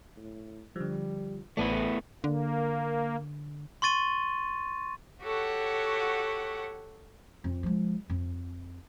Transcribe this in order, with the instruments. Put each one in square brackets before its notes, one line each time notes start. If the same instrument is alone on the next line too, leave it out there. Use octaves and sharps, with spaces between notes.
[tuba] A2
[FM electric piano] D3 F3 [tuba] G3
[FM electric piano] A1 A4 D5 [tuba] E3 [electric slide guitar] A3 B3 E4
[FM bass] D3 [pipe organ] A#3
[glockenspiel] C6 C#6 A6 D#7
[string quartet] F#4 G4 A4 C#5 F#5
[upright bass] F2
F3 G#3
F2